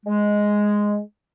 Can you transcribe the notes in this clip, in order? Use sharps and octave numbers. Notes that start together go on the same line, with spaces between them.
G#3